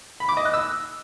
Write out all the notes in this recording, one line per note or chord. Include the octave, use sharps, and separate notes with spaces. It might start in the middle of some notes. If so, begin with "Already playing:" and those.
B5
D6
D#5
F#6
E6